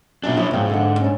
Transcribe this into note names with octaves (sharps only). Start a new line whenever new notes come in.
F#2 B2 D4 F4
F3 F#3 E4
G#2 F3 C4
D3 F#5
C#4 D4